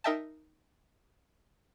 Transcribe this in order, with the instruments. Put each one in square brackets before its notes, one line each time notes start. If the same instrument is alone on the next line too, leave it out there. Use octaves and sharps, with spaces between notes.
[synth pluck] D#4 A#4 D#5 E5 G5 A5